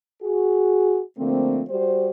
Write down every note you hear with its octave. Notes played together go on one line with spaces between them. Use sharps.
F#4 G#4
D3 F3 A3 A#3 C4
G3 F#4 G4 C5